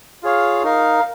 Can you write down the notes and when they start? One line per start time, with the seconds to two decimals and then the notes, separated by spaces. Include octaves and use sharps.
0.23 F4 G#4 C#5 F5
0.63 D#4 A#4 F5